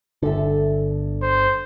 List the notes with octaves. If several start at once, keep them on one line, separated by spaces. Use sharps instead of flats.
G1 D3 A4 E5
C5